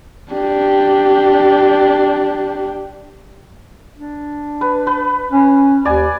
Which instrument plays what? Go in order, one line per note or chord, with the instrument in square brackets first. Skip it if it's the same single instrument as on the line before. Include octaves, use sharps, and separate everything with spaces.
[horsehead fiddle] D4 G4
[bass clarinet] D4
[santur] B4
B4
[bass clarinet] C#4
[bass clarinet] D#2 [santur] D5 G#5